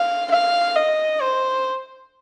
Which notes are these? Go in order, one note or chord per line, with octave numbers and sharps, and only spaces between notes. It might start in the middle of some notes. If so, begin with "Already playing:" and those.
Already playing: F5
F5
D#5
C5